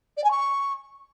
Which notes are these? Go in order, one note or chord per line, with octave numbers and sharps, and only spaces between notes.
D5
G#5
C#6